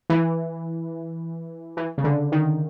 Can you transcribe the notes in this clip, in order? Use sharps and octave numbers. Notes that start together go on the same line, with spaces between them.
E3
E3
C#3
D3
D#3